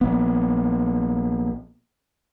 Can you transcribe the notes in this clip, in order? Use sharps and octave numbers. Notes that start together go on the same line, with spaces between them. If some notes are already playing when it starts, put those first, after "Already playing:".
A#1 B3